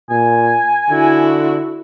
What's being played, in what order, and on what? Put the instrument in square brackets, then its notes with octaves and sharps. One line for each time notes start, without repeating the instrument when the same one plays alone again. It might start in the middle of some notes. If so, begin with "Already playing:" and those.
[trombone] A#2 [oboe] G#5
[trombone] D3 [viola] E4 F#4